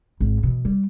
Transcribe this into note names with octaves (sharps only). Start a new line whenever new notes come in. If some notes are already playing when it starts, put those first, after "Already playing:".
G#1
B2 E3
G3